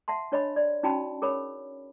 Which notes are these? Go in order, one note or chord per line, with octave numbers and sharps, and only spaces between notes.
E5 F#5 A5 C6
D4 C#5 D#5 B5
D5
C#4 D#4 F#4 G5 A5 B5
G#4 A#4 C#5 B5